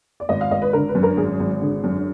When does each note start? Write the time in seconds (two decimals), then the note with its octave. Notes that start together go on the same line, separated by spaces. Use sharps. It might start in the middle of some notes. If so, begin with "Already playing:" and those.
0.20 D5
0.29 G#1 D#5
0.41 F5
0.51 G#1 D#5
0.62 B4
0.73 D3 A#4
0.89 B4
0.95 F#2
1.03 A#4
1.17 G#1 G#4
1.40 G#1
1.61 D3
1.84 F#2